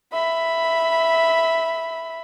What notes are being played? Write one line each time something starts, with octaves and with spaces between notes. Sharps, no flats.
E5 B5